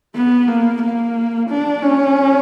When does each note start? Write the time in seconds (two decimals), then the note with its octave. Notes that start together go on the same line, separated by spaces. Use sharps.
0.15 B3
0.48 A#3
0.82 A#3
1.50 D4
1.83 C#4